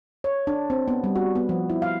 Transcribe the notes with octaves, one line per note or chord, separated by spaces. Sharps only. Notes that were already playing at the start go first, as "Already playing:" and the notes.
C#5
D4
C4
B3
G3
F#4
B3
F3
E4
F5